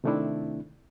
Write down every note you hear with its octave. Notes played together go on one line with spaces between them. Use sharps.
C3 D#3 A3 C4 D4 E4